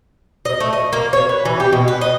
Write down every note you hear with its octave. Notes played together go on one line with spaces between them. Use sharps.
D#5
A3
D#5
A#3
C#5
B4
E3
G4
B2
B4
D#5